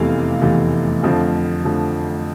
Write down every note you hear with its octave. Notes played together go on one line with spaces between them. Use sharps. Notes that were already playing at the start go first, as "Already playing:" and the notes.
Already playing: F1 E2 C3 E3 A3 F5
F1 E2 C3 E3 A3
F2 D3 F3 A3 C4
D3 F3 A3